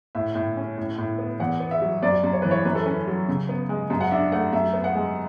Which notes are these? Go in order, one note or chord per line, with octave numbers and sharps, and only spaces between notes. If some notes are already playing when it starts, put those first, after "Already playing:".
A2 E5
A2
C#4
A2
A2
B3
E2 F#5
B3
E5
F#3
F#2 D5
F#2
C#5
E3 B4
C#5
F#2 B4
A4
C#4 B4
F#3
C#3
B3
G#3
F#2
F#5
D4 E5
A3 F#5
F#2 E5
B3
F#5
G#3